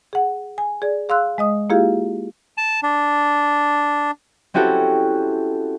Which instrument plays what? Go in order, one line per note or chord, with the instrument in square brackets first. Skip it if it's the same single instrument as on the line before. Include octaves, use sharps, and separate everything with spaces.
[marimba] G#4 F#5
G#5
G#4 D5
G#4 F5 C6 E6 F#6
G#3 D#5 D#6
A#3 E4 F4 G4 G#4 F5
[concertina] A5
D4
[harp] C4 C#4 E4 F#4 G4 A4